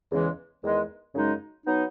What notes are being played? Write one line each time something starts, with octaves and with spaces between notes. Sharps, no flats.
E2 C#3 E3 G#3
E2 D#3 G#3
F#2 C#3 G#3 D#4
F#3 B3 D#4